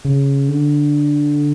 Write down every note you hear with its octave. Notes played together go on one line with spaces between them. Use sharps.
C#3
D3